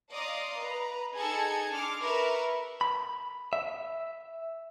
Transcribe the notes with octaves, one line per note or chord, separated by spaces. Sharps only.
D5 D#5 F5 A#5 C6 D#6
B4 A#5
D#4 G#4 A4 G#6 C#7
D4 C6 D6 F6
A#4 B4 E5 C#6
B5
E5